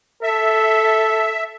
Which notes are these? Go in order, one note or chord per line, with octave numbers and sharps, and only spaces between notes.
A4 E5